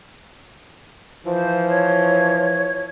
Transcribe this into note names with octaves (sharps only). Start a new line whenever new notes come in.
E3 F3 C5
C#5